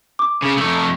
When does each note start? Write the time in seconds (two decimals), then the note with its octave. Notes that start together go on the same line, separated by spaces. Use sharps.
0.19 D6
0.42 C#3
0.57 F2 A3